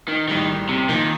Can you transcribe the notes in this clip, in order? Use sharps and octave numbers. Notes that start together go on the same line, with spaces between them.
D#3
A#1 A2 D#3 G3
C3
A#2 D#3 F3 A#3